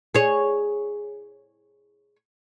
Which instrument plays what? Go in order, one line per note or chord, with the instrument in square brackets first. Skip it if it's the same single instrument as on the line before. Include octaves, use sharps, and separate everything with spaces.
[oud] G#4 C#5